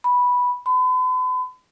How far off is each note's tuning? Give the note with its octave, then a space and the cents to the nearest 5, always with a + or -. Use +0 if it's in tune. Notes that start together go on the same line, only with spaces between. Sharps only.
B5 -5
B5 +40